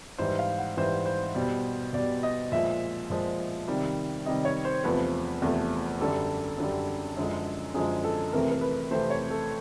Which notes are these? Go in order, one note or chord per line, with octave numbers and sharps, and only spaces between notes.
G#2 E3 G3 C5
F5
F#5
G#2 E3 G3 C5
C5
B2 G3
B2 G3 D5
D#5
A#2 F3 G#3 E5
A#2 F3 G#3
C3 D#3 G3
C3 D#3 G3 D#5
C#5
C5
E2 C3 F3 A3 B4
E2 C3 F3 A3
F#2 D3 G3 A4
F#2 D3 G3
F#2 D3 F3 G#3
F#2 D3 F3 G#3 G#4
A4
F2 C3 E3 A3 A#4
A#4
B4
F2 C3 E3 A3 C5
C#5
A4